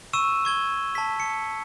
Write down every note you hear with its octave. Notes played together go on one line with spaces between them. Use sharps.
C#6 E6 D#7 E7
C#6 G#6 G7
A5 B6
C#7